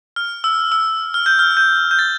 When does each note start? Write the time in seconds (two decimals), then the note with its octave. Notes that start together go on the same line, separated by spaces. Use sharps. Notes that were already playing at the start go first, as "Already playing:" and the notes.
0.16 F6
0.44 E6
0.72 E6
1.14 F6
1.26 G6
1.39 F6
1.57 G6
1.91 G6
1.99 A6